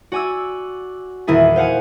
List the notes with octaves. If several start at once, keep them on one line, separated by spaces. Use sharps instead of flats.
F#4 D5 G#5 D6 E6
D#1 E2 D#3 E4 G#4 A6
C5 F5 F#5 G#5